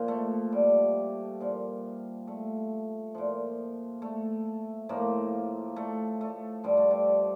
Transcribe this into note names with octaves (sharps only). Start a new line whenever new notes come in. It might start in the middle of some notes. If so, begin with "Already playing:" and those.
Already playing: A#2 F3
A3
G3
A#2 F3
A3
A#2 F3
A3
A2 F3 A#3
A3
A3
G2 F3 G3
A3
G3